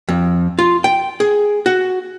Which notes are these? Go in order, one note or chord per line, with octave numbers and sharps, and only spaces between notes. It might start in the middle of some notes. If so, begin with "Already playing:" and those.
F2
F4
G5
G#4
F#4